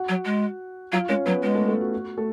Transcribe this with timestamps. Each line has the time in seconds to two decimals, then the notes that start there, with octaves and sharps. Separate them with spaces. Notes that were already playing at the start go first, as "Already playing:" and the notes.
Already playing: F#4 F#5
0.09 F#3
0.25 G#3
0.92 F#3 F4 F5
1.09 G#3 C#4 C#5
1.25 F#3 B3 B4
1.42 G#3 B3 B4
1.55 A3 A4
1.67 A3 A4
1.81 F#4
1.93 F#4
2.17 A3 A4